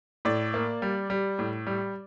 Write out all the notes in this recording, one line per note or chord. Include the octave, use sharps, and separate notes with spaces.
A2 D5
A#3
G3
G3
A2
G3